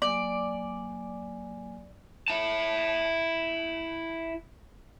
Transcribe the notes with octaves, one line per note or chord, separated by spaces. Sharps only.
F#3 A#3 D5 G#5
E4 A5